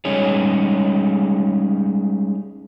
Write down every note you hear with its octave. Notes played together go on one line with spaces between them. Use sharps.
G3 G#3 C#4 D#4 G#4 C#5